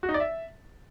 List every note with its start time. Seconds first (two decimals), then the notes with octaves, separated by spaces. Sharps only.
0.03 F#4
0.09 D#4
0.14 D5
0.20 E5